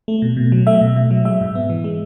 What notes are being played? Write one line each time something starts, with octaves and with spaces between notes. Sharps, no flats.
A3
B2
B2
F#3
A3 E5
B2
B2
F#3
G#3 E5
G#2
B3
E3
G#3